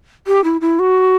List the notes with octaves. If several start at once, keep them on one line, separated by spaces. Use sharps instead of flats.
G4
E4
E4
F#4